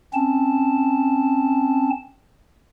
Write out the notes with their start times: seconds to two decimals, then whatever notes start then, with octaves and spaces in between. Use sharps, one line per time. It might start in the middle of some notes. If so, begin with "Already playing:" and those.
0.14 C4 C#4 A5